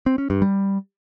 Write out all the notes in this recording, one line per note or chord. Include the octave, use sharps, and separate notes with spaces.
C4
C#4
G2
G3